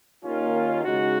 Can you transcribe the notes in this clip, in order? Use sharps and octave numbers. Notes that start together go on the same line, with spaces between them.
D#2 D#3 A#3 C#4 F4
C#3 G#3 D#4 F#4